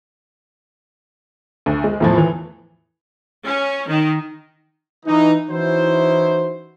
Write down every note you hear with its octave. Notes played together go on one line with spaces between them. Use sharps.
D2
G#3
E2 A2 F3
E3
C#4
D#3
E3 D#4
E3 C#4 D#4 E4 F#4 C5